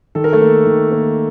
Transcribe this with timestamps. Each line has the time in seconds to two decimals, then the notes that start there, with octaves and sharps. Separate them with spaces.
0.15 D#3 A4
0.24 A#4
0.32 A3 A4
0.41 A#3
0.66 D#3
0.92 A#3